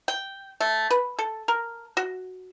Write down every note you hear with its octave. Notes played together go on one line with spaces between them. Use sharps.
G5
A3
B4
A4
A#4
F#4